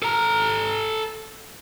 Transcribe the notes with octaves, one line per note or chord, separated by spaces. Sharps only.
A4 A#5